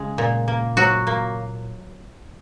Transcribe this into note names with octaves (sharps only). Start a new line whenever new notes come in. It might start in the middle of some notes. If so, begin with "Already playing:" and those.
Already playing: C#3 G#3
A#2
A#3
F#3 F#4
A#3